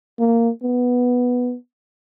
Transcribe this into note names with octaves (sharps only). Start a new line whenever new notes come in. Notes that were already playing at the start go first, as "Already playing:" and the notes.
A#3
B3